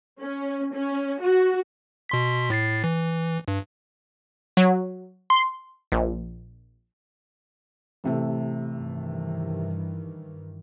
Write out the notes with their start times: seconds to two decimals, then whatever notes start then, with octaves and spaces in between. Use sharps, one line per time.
0.21 C#4
0.74 C#4
1.22 F#4
2.09 B2 C6 B6
2.50 A2 A6 C7
2.84 E3
3.48 G2
4.57 F#3
5.30 C6
5.92 A#1
8.04 A1 C3 A3
8.73 G2 D#3 E3